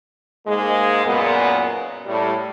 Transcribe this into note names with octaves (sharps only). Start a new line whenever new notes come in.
G#2 G#3 A#3
F#2 A#2 B3
A2 G3